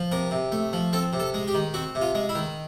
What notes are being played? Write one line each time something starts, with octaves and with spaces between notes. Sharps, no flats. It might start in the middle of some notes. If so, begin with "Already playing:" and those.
Already playing: F3
C3 A#4
C3
A3
F3
C4 A4
C3
A4
G#3
G4
D#3
C4 F#4
C3
F4
G#3
E4
D#3